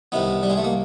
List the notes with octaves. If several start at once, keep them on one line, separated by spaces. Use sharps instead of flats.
C2 C3 D#3 B3
G3
G#3
A3
A#3